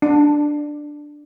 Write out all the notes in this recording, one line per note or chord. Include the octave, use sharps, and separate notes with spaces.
D4